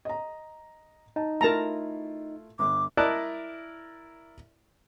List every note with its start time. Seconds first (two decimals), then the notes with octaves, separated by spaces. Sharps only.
0.05 D#5 A#5
1.16 D#4 A5
1.41 A3 E4 F4 A#4 A5 A#5
2.59 G1 D6
2.97 E4 A#4 D5 D#5 A5 F#6